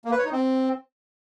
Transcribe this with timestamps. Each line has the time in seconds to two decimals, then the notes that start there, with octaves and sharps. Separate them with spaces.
0.05 A#3
0.12 B4
0.18 C#5
0.25 D#4
0.32 C4